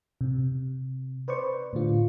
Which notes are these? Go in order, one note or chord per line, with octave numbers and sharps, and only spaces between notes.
C3
B4 C5 D5 C#6
A2 D3 F4